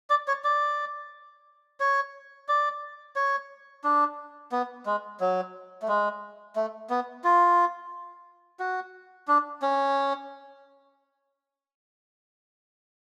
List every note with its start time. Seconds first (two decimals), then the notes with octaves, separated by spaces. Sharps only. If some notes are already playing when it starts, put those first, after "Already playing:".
0.10 D5
0.28 C#5
0.44 D5
1.80 C#5
2.48 D5
3.16 C#5
3.84 D4
4.52 B3
4.86 G#3
5.20 F#3
5.82 A3
5.88 G#3
6.56 A3
6.90 B3
7.24 F4
8.60 F#4
9.28 D4
9.62 C#4